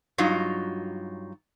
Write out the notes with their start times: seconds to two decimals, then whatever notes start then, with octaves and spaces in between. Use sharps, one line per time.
0.18 G2 F#3 D#4 F4